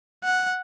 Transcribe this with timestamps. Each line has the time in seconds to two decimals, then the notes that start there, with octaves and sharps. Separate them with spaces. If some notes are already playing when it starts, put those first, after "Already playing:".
0.24 F#5